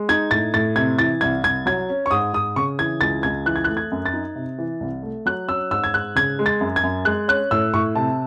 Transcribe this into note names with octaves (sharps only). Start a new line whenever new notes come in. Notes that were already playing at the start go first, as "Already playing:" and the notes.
Already playing: G#3
D#4 G#6
A2 A6
A2 A6
C3 G#6
E3 A6
C2 G#6
C2 G#6
F#3 G#6
C#4
C#6
G#2 D#6
G#2 D#6
C#3 C#6
E3 G#6
C#2 A6
C#2 G#6
E3 F#6
G#6
F#6
A3
G#6
F#2
A6
D#4
C3
E3
C2
A3
F#3 F#6
C#4 E6
G#2 E6
G#6
G#2 F#6
C#3 G#6
G#3
A6
F#2
G#6
F#2
G#3 F#6
C#4 F#6
A2 E6
A2 C#6
C3 A5